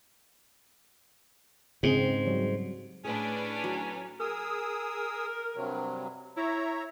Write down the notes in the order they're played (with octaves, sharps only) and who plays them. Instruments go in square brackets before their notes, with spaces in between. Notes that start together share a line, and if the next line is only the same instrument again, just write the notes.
[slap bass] G#2 [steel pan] C#3 C4 G#4
[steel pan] F#3 G3 C#5
[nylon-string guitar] A2 G#4 [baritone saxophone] C#4 [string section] D4 B4
[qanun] F#3
[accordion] G#4 D#6 E6 [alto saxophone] A#4
[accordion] G2 C3 F#3
[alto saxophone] E4 [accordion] C#5 E5 A#5